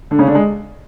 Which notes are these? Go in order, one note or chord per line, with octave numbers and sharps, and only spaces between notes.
D3 D4
C#3 C#4
D3 D4
G#3